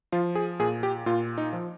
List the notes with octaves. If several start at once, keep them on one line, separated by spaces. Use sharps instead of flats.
F3 F4
G#4
A#2 G#4
G4
A#2 F4
D#4
F3